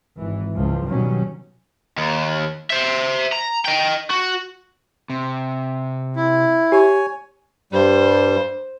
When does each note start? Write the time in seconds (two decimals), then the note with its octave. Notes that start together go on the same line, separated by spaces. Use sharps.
0.16 G#1 E3
0.56 C#2 F3
0.88 B2 D#3 F#3 G3 C#4
1.97 D#2
2.70 C5 E5
3.32 A#5
3.65 D#5 G5
4.10 F#4
5.10 C3
6.16 E4
6.72 G4 C#5 G#5
7.73 G2 G3 C5